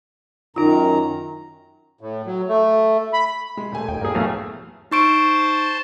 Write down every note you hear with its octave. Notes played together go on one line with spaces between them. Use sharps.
F#2 D#3 D#4 F4 A#5
A2
F#3
A3
B5
G#3
D#1 A3 G#5
D#2 G5
G2 A#3 G#4
E2 G2 F#3 A3 F5
D#4 C5 A5 C#6 D7